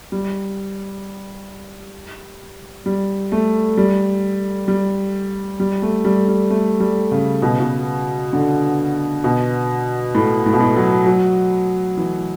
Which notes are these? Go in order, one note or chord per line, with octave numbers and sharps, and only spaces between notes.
G3
G3
A3
G3
G3
G3
A3
G3
G3
A3
G3
C#3
B2
C#3
B2
D3
B2
A2
A2
B2
A2
F#3
F#3
E3